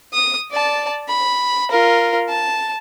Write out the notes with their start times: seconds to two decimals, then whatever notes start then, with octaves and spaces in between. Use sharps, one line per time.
0.13 D#6
0.51 D5 A5
1.09 B5
1.71 F4 A#4
2.29 A5